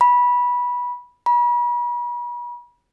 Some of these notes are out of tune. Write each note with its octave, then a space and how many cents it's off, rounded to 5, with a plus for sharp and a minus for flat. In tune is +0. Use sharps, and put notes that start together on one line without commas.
B5 -15
B5 -40